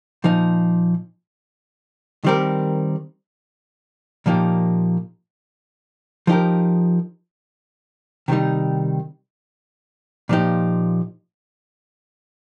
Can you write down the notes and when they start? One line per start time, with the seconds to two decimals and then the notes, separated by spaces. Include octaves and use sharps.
0.24 A#2 F3 D#4
2.24 D#3 G3 C4 G4 A#4
4.26 A#2 F3 A#3 D#4 G4
6.27 F3 D#4 G4 A#4
8.28 C3 D#3 G3 D#4
10.29 A#2 F3 D#4 G4